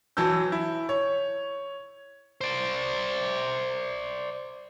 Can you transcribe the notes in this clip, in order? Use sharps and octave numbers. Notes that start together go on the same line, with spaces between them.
E3 F#3 A5 E6 G6
E4
C#5
C5 D5